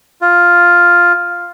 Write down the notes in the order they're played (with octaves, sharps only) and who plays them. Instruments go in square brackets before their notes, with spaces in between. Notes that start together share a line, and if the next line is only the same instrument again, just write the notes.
[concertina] F4